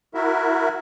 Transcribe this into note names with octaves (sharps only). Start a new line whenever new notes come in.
E4 F#4 A#4 E5